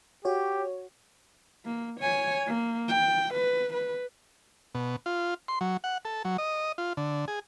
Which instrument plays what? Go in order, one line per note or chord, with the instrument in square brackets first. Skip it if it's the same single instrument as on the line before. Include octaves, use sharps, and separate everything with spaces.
[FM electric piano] F#4 C#5 [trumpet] G4
[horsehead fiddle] A#3
C#5 G#5
A#3
G5
B4
B4
[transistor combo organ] B2
F4
C6
F#3
F#5
A4
F#3
D#5
F4
D3
G#4